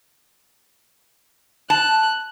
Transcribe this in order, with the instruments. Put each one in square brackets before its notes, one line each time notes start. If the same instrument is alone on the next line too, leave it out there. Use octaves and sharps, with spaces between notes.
[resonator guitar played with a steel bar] A5 [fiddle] F#6